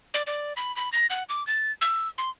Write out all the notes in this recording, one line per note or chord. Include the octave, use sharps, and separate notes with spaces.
D5
D5
B5
B5
A#6
F#5
D6
A6
E6
C6